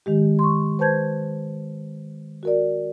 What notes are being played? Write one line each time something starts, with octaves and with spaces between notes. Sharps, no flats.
D#3 G#3 G4
C6 C#6
B4 C5 A5 G6 G#6
F#4 A#4 D5